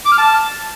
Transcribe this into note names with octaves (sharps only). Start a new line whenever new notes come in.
D6
F6
A5